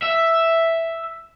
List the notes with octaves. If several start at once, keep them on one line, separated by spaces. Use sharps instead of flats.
E5